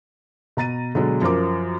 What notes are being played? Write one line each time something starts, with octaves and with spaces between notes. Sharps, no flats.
B2 A#5 A6 D#7
B2 D3 F#3 G#3
F#2 F3 A#4 D6